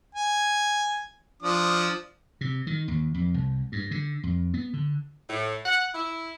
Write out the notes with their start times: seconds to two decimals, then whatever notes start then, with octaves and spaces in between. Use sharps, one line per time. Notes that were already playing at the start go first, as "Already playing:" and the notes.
0.15 G#5
1.43 F3 D4 D#6
2.41 C3
2.67 D#3
2.88 D#2
3.14 F2
3.34 C2
3.72 G2
3.91 D3
4.23 F2
4.54 B3
4.73 D3
5.30 A2
5.65 F#5
5.94 E4